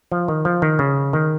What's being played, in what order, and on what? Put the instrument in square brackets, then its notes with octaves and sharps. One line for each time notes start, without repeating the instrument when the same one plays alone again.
[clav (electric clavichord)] F3
D#3
F3
D#3
C#3
D#3